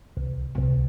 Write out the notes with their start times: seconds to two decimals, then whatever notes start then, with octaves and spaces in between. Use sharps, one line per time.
0.17 C2
0.58 C2